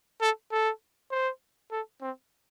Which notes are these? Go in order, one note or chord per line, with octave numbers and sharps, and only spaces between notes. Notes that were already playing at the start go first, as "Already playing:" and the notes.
A4
A4
C5
A4
C4